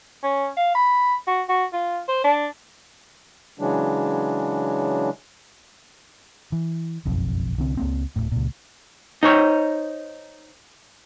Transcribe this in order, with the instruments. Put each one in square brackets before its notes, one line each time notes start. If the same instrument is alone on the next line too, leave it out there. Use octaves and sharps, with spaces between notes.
[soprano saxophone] C#4
F5
B5
F#4
F#4
F4
C5
D4
[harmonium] C#3 E3 F#3 G#3 D4
[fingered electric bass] E3
F#1 B1 F2
C2 D3 C4
C#2 A#3 C4
D1 G#1 A2
C#2 A#2
[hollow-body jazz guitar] D#4 C5 C#5